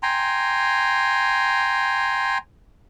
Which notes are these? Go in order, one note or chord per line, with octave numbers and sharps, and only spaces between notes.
G5 G#5 A#5 C6